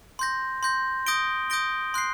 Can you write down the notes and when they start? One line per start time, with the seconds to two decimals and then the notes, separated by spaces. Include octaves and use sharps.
0.19 C6 G6 A#6
0.63 C6 G6 A#6
1.06 D#6 G6 A#6 D7 G7
1.50 D#6 G6 A#6 D7 G7
1.94 C6 F#6 C7